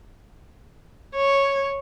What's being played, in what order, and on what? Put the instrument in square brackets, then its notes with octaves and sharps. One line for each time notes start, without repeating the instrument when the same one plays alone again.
[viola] C#5